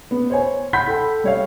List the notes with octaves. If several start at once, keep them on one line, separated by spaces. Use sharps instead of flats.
B3
C5 C#5 G#5
F#5 B5 C6 G6 B6
A4 G5
G3 C#5 F5